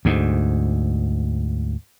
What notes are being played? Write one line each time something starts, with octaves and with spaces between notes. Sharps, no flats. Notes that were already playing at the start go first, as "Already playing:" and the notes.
D2 G#2